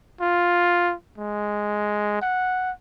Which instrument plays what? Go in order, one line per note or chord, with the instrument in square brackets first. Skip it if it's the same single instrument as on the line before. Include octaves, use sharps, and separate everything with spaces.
[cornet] F4
G#3
F#5